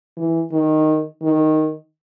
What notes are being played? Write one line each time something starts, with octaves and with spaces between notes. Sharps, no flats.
E3
D#3
D#3